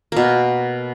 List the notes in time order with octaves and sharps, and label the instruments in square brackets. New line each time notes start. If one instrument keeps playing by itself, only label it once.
[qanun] B2 A#3